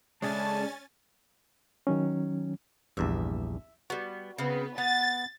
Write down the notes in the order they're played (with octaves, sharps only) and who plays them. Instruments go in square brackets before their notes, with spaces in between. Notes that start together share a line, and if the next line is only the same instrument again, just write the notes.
[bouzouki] C#3 A3 D4 [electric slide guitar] G#3 [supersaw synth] C#4 G#5 A6 [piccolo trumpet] A5
[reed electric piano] D#3 F#3 C#4
[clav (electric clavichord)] A#1 E2 G2 [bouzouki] E5
[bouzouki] G3 B3 [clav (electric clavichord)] F#4
[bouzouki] C#3 C4 [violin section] B3
[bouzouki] B3 F#5 [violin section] A6